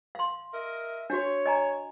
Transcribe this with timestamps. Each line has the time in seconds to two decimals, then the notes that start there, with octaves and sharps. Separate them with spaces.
0.15 F5 C6
0.53 A#4 D#5 E5
1.10 D4 F#4 C#5
1.46 D#5 G#5 A#5